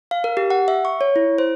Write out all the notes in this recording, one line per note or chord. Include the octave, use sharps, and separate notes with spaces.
F5
A#4
G4
F#5
E5
C#6
C#5
E4
C5